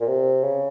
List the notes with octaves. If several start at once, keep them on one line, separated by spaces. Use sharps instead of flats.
A#2
C3
C#3